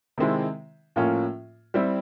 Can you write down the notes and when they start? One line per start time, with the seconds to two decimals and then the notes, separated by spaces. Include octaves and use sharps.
0.18 C3 D#3 G#3 C4 E4
0.96 A2 F3 A#3 C#4 F4
1.74 G3 C4 E4